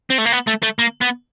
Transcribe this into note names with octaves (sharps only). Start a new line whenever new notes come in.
C4
A3
A#3
B3
A3
A3
A#3
B3